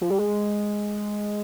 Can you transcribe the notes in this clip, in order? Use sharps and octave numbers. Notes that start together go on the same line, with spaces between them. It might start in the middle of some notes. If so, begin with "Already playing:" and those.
F3
G3
G#3